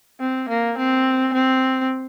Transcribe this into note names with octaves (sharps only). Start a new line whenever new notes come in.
C4
A#3
C4
C4